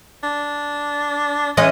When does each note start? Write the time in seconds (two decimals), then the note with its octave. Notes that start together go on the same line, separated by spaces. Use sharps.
0.23 D4
1.57 E3 G#3 C#4 D#5